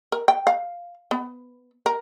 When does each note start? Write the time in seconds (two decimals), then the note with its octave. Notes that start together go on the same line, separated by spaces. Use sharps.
0.12 A#4
0.28 G5
0.47 F5
1.11 B3
1.86 A#4